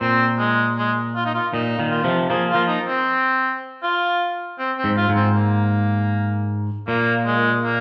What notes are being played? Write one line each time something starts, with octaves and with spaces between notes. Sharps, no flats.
A#2 C4
G#3
G#3
F4
D#4
F4
A#2 D#4
A#2 D#3
F4
C3 F3
F3 A#3 G#4
F4
F3 A#3
D#4
C4
F4
C4
C4
G#2
F4
G#2
C4
A#3
A#2 A#3
G#3
A#3